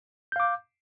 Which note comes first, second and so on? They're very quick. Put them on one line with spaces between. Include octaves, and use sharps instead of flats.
G6 F5 D6